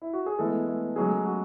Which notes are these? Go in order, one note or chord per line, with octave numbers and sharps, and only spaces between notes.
E4
F#4
G#4
E3 G#3 A3 B3 A4
A3 A4
C#3 F#3 G#3 A3 G#4
F#4